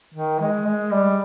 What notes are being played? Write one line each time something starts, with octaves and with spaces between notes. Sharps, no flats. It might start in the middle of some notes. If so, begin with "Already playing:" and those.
D#3
G#3
G#3
G3